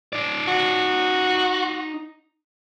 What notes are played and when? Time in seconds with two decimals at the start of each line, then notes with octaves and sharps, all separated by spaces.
0.13 D#4 D5
0.48 F#4